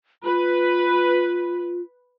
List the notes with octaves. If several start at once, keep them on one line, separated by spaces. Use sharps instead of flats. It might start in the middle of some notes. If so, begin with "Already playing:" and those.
F4 B4